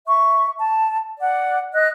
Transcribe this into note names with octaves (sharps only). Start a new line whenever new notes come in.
E5 C#6
A5
D5 F#5
D#5 F#6